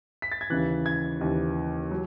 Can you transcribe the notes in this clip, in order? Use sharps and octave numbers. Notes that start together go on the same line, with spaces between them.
B6
A6
G#6
D#2 C#3 E3 F#6
G#6
D#2 C#3 E3
F#3